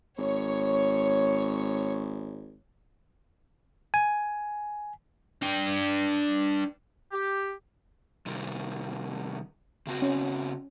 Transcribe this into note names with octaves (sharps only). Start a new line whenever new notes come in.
G#1 C#5
G#5
D4 G5
G4
C3 D#3 G3
C#3 C4 F#4
C#4